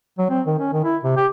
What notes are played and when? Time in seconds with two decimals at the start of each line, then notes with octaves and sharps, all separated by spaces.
0.19 F#3
0.30 C4
0.46 D#3
0.59 C#4
0.73 D#3
0.85 E4
1.03 C3
1.17 G4